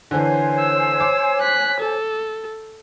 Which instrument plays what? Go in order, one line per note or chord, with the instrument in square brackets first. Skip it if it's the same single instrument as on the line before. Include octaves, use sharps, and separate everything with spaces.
[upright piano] D3 E3 [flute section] C5 C#5 G#5
[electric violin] E6
[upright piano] D6
[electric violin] F#6 B6
A4